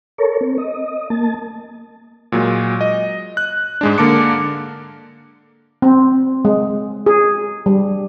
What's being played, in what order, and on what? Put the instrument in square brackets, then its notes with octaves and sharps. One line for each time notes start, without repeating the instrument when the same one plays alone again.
[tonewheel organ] A4 A#4 C#5
C4
D#5
A#3 A5
[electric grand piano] A#2 F#3 G#3
D#5
F#6
G#2 G#3 D4
D3 A#3 A5 D6 C#7
[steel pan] C4
G#3
G#4
G3